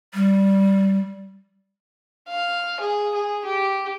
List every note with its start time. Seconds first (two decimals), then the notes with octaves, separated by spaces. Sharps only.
0.14 G3
2.28 F5
2.80 G#4
3.14 G#4
3.45 G4